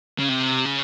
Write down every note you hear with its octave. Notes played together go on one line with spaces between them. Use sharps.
C#3
C3
C#3